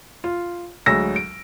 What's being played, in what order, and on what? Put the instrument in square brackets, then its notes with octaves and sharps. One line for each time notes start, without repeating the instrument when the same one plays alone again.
[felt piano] F4
D2 F#3 G#3 E6 A#6
D7